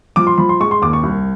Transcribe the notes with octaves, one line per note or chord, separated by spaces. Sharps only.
F3 D6
C6
F3 B5
C6
G#3 C#6
C6
D#2 D6
C#6
C2